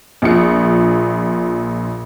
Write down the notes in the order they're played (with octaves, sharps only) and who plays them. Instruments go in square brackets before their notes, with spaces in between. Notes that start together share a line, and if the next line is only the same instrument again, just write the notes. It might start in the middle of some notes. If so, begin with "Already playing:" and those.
[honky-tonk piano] A#1 A#2 C#7